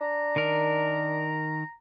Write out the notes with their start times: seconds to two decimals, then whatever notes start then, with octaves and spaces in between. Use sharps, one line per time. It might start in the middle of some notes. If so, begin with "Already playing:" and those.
0.01 D4 A#5
0.36 D#3 A#4